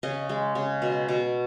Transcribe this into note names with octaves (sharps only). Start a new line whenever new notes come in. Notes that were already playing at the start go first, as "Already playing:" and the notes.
C#3 D#5
G#3
C#3
B2
B2